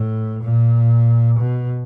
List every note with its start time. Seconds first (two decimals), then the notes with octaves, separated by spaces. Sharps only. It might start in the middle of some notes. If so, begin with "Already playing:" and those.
Already playing: A2
0.43 A#2
1.39 B2